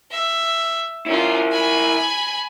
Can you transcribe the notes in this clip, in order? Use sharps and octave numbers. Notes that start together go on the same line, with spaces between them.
E5
C#4 E4 F4 A#4
G#5 B5